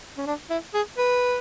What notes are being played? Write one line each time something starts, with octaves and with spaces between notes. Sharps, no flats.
C#4
D4
E4
G#4
B4